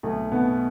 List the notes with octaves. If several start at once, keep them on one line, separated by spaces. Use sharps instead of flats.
B1 A3
B2 B3